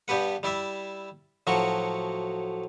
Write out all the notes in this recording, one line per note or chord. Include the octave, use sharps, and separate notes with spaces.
G2 B3 G4 B4 F#5
G3 E4 D5 E5
A2 F3 F#3 F#4 C#6